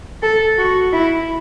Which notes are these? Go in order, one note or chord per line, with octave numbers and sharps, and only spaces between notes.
A4
F#4
E4